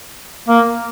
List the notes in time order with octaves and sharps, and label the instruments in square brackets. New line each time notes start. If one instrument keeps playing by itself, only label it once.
[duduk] A#3